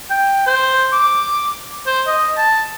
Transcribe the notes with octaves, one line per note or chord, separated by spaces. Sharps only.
G5
C5
D6
C5
D#5
A5